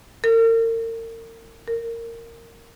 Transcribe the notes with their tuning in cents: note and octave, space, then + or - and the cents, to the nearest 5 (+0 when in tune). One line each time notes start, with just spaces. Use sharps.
A#4 -40
A#4 -15